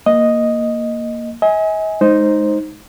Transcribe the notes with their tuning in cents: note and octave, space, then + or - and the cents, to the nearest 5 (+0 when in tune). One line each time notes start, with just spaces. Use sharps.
A#3 +0 D#5 +0
D#5 +45 G#5 +0
G#3 +25 D#4 +0 C5 +0